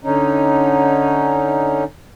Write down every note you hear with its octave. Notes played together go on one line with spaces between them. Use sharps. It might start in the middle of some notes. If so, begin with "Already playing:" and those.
D3 C#4 D#4